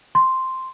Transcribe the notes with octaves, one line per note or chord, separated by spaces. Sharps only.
C6